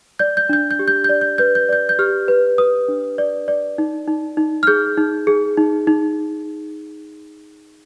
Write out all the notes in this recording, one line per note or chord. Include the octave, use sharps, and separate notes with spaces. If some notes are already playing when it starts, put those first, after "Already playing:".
D5 G6
G6
D4 G6
G6
G4
G6
G6
D5
G6
B4 G6
G6
D5 G6
G6
G4 F6
B4
B4 D#6
D4
D5
D5
D#4
D#4
D#4
F6
G#4 G6
D#4
G#4
D#4
D#4